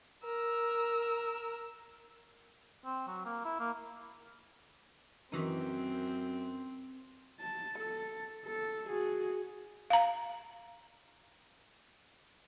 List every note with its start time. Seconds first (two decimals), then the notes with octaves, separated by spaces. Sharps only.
0.24 A#4 E6
2.85 C4
3.07 F#3
3.25 A#3
3.45 E4
3.59 A#3
5.32 F#2 D#3 E3 C4 D#4
7.40 A5
7.79 A4
8.46 A4
8.89 F#4 G#4
9.90 F5 A#5